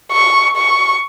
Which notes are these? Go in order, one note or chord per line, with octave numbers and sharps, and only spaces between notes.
C#6
C#6